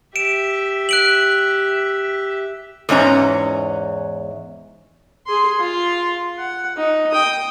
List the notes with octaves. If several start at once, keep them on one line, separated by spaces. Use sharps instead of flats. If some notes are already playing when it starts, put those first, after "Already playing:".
G4 E5 D7 E7
F#6 D7 F#7
E2 G#2 C#4 A#5
G#4 C6
F4
F#5
D#4
G5 D#6